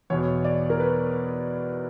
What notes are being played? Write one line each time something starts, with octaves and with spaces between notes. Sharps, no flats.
E2 B2 C#5
D5
A#4
B4